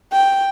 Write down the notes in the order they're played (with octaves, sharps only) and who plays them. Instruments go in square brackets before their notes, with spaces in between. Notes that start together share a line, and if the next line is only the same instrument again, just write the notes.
[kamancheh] G5